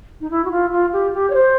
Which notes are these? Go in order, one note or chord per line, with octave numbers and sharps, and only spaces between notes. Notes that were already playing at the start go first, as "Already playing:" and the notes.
D#4
E4
F#4
F4
F4
G4
G4
C#5
C5